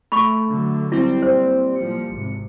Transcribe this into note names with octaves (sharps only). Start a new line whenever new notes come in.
A3 B5 C#6
D3 F#3
G3 C4 E4
A#2 C5
A#2 F3 G3 C#7
G#1 C3